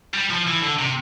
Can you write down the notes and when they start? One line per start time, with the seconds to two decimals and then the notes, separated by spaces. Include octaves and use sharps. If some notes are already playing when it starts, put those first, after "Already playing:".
0.14 G3
0.30 F3
0.47 E3
0.62 D3
0.79 C3